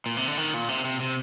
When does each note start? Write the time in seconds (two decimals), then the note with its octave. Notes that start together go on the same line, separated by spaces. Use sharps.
0.06 A#2
0.17 C3
0.28 D3
0.38 D#3
0.54 A#2
0.69 C3
0.84 C3
1.00 C3